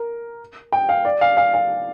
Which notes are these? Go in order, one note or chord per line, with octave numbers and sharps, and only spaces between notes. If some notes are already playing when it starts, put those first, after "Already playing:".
Already playing: A#4
G5
F5
D5
F5
F5
F5